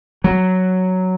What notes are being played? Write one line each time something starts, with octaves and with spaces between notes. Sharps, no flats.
F#3